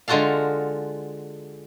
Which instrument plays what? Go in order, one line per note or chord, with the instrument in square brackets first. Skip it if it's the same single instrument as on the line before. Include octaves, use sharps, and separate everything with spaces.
[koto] D3 G#3 F4 F#4 A4 F5